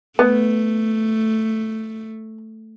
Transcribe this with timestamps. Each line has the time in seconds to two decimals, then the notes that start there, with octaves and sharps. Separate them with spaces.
0.19 A3 B3